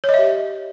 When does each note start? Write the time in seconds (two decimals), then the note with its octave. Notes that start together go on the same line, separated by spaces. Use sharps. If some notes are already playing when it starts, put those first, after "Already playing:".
0.04 C#5
0.09 D#5
0.14 E5
0.19 G4